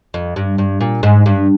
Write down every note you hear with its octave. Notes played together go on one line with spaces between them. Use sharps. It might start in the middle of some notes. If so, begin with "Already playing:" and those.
F2
G2
G2
A#2
G#2
G2